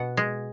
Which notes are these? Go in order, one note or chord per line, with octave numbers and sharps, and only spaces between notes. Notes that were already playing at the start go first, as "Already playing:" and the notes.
Already playing: B2 F#5
G#3